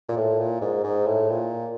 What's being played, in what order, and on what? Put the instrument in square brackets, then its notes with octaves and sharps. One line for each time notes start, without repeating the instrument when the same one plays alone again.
[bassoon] A#2
A2
A#2
G#2
G#2
A2
A#2